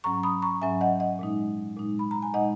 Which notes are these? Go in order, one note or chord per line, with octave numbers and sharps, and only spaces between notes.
G#2 F#3 C#4 A#5 C#6
B5 D#6
A#5 C#6
G#2 F#3 C#4 E5 G#5
D#5 F#5
D#5 F#5
A#2 G#3 D#4
A#2 G#3 D#4
B5
A#5
G#5
A#2 G#3 D#4 D#5 F#5